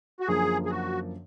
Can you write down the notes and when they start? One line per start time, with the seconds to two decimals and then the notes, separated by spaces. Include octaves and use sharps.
0.20 F#4
0.28 F#2 D3 F3 A#3 G#4
0.66 G#4
0.70 F#4